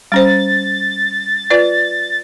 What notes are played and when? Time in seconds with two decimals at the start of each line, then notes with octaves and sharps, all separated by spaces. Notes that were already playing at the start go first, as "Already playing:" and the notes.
0.12 G3 C#4 C5 A6
1.50 F4 B4 D5